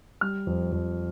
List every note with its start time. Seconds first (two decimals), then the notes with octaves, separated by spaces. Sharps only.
0.21 G3 F6
0.47 F2
0.72 F2